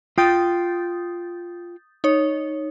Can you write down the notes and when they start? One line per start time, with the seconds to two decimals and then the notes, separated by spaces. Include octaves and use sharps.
0.18 F4 G5 D#6 G6 A6
2.04 D#4 C#5